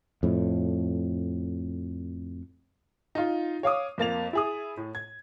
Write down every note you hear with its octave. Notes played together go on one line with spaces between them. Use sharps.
F2 A2
D#4 F4
C#5 F5 D6 D#6
F2 A#3 A6 F7
E4 G#4 D#6
A2
G#6